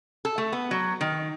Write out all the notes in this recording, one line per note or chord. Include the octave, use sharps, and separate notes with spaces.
A4
A3
B3
F#3
D#3